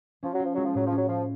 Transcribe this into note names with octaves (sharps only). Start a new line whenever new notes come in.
F3 C#4
F#3
F3 F4
F#3 G#3
F3
A2 F#3
F3
F#3 C#4
F3 F4